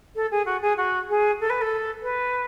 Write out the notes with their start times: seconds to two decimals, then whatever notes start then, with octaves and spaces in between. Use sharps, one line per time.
0.15 A4
0.31 G#4
0.46 F#4
0.62 G#4
0.77 F#4
1.09 G#4
1.41 A4
1.50 B4
1.61 A4
2.03 B4